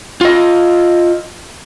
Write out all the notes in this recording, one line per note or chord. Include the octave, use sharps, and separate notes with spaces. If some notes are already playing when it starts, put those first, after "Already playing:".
F4 D#5